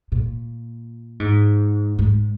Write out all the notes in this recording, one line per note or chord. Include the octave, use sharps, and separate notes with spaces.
A#2
G#2
G#2